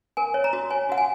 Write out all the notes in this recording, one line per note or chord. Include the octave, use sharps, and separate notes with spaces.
A#4 G#5
C#5
A#5
F#4
C#5 G#5
F#4 F#5
G#5